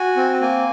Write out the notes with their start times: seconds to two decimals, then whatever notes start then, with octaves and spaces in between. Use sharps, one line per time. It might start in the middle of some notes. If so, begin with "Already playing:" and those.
Already playing: F#4 G#5
0.17 C4
0.41 A#3 G#5